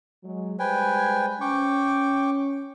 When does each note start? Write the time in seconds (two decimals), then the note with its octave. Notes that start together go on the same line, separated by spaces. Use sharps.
0.24 F#3 G#3
0.59 G3 G#3 B4 C5 G5 G#5
1.41 C#4 G5 C#6 D6